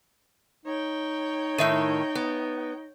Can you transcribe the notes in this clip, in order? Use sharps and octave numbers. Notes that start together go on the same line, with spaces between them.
D#4 C#5 G5
A2 D#3 E5 D#7
B3